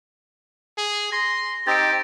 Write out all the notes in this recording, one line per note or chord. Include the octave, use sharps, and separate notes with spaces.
G#4
C6 A#6
C4 D#4 G4 C5 A6 D7